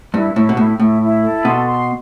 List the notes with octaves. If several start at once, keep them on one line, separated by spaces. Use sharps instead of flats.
G2 E4
A2 E4
B2
A2 E4
A2 E4
E4
A4
B2 C6
C6